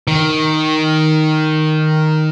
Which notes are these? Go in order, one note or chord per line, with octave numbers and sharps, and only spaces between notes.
D#3